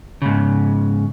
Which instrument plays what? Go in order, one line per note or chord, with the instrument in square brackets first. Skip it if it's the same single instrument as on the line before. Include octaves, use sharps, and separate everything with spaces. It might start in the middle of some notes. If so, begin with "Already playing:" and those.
[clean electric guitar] G#2 C#3